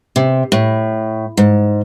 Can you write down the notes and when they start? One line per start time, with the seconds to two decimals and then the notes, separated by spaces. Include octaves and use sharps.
0.16 C3
0.52 A2
1.37 G#2